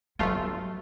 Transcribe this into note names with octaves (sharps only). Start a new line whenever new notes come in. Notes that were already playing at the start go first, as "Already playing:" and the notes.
G1 F#3 A3 F4